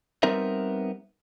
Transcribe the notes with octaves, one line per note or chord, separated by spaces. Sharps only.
G3 B3 C4 D#4 A#4 E5